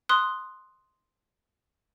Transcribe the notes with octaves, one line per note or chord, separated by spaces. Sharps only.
C6 D#6 F#6